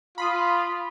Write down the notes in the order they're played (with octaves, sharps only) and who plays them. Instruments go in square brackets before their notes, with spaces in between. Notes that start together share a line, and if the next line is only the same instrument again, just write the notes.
[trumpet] F4 [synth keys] B5 C6 D#6